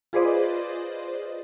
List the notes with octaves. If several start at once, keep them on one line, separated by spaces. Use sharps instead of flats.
F4 G#4 B4 C5 D5 D#5